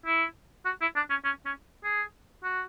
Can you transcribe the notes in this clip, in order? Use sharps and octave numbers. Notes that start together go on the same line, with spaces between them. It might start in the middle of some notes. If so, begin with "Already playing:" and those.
E4
F#4
E4
D4
C#4
C#4
C#4
G#4
F#4